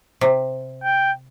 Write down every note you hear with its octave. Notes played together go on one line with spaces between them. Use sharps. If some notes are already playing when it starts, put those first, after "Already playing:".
C3
G5